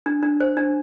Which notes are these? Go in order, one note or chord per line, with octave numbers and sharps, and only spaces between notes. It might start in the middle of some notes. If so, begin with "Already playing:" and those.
D4
D4
C5
D4